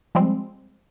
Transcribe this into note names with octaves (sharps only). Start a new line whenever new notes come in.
F3 G3 G#3 C4